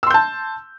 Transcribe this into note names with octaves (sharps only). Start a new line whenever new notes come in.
A5 C6 E6 G6